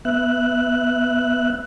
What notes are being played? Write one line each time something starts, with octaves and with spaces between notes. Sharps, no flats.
B3 E5 F#6